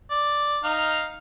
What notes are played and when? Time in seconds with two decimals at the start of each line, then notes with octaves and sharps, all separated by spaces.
0.11 D5
0.64 D#4 F5